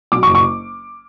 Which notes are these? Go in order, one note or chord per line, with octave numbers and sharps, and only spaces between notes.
F#3 D6
C#6
F#1
C#6